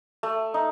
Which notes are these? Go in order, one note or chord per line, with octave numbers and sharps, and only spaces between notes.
A3
D#4